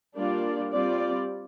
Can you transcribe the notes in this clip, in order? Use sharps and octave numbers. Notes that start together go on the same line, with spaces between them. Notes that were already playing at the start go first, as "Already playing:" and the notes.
G3 A#3 D4 F4 D5
G3 C4 F4 D5